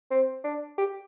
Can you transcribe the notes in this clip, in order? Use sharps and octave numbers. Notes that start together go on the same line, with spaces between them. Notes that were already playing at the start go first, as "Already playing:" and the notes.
C4
D4
G4